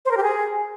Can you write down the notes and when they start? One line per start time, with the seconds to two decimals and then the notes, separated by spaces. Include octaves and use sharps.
0.05 C5
0.11 A#4
0.17 G4
0.23 G#4